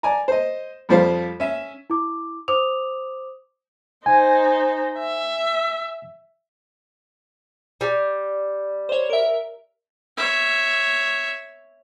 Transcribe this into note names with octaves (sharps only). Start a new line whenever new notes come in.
D5 G#5 A#5
C5 D#5
F2 F3 G3 F4 C5 F5
C#4 E5
E4 D6
C5 D6 D#6 F7
D#4 C5 G#5
E5
G3
C5 C#5
A#4 E5
C#5 E5